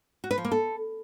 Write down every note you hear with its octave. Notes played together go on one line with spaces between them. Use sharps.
F#4
B4
F3
A#3
A4